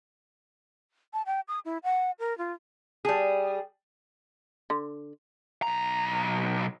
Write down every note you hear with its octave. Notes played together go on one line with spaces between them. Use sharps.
A5
G5
D#6
E4
F#5
A#4
F4
G3 G#4
D3
B1 A#5